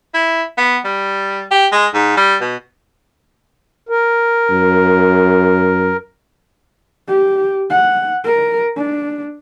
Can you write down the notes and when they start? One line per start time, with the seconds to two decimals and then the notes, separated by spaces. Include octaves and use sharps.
0.14 E4
0.57 B3
0.85 G3
1.51 G4
1.72 G#3
1.94 G#2
2.17 G3
2.41 B2
3.89 A#4
4.51 F#2
7.08 G4
7.70 F#5
8.24 A#4
8.77 D4